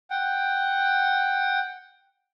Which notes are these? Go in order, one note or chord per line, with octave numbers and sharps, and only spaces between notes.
F#5 G5